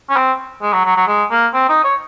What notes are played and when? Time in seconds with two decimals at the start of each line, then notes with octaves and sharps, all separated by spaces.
0.09 C#4
0.16 C4
0.62 G#3
0.73 F#3
0.85 F#3
0.96 F#3
1.08 G#3
1.31 A#3
1.54 C4
1.69 D#4
1.84 C#5